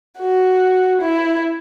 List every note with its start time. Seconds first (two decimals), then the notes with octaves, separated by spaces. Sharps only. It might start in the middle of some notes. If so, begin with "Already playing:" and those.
0.19 F#4
1.01 E4